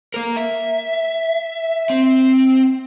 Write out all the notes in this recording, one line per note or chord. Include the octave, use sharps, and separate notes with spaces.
A#3 A#4
E5
C4